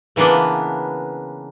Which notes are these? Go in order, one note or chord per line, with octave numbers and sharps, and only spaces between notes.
C#3 E3 A#3 B3 D4